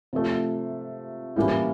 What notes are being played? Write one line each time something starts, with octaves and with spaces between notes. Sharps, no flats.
C3 F3 A3
A2 E3 G3 A#3 C#4